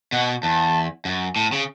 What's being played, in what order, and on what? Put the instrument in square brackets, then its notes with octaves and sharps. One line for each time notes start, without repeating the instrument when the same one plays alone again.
[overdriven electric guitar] B2 [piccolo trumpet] F#5
[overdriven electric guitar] E2 [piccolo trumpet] A5
[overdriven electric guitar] F#2
A2
C#3